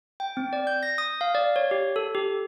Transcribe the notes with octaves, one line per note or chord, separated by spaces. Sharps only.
G5
C4
D5
G6
A#6
D#6
F5
D5
C#5
G4
A4
G4